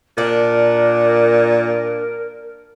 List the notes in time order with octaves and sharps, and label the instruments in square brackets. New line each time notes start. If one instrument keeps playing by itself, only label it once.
[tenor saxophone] A#2 [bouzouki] D4 [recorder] A#4